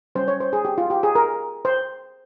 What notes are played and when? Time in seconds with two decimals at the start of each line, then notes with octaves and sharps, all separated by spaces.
0.15 G3 C#4 C5
0.28 C#5
0.40 C5
0.53 G#4
0.65 G4
0.78 F4
0.90 G4
1.03 G#4
1.15 A#4
1.65 C5